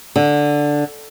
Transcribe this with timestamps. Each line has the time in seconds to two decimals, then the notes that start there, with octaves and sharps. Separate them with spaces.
0.16 D3